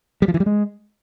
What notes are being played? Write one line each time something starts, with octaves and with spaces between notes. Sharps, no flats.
G3
F3
E3
G3
G#3